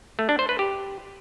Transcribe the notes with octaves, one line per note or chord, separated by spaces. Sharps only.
A3
D4
C5
B4
G4